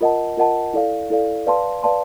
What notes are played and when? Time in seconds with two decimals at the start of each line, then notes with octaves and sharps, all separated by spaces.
0.01 F4 A#4 D#5 F#5 A5
0.37 F4 A#4 D#5 F#5 A5
0.73 E4 A4 D5 F5
1.10 E4 A4 D5 F5
1.47 B4 D5 F5 A5 C6
1.83 B4 D5 F5 A5 C6